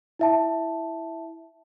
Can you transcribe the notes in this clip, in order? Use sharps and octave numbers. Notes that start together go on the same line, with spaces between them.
E4 E5 A5